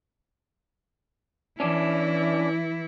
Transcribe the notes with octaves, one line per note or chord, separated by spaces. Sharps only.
E3 C#4 D4 E4